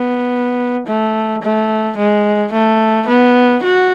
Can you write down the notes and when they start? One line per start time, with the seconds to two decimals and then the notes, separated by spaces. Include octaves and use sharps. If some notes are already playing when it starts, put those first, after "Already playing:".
Already playing: B3
0.87 A3
1.42 A3
1.97 G#3
2.53 A3
3.08 B3
3.63 F#4